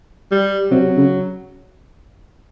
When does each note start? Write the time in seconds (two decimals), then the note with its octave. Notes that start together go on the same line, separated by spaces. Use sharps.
0.31 G3
0.71 C3 F#3
0.97 C#3